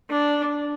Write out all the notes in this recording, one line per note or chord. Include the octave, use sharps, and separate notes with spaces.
D4